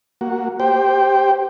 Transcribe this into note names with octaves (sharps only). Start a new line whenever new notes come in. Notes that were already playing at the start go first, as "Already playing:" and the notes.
A#3 F#4
G4 C5 G5